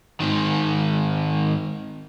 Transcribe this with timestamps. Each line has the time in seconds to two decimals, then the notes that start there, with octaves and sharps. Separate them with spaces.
0.20 G#2 D#3